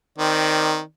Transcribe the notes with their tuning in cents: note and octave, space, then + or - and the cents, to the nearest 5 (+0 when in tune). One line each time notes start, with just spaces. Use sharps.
D#3 +0 C4 +0 D5 +15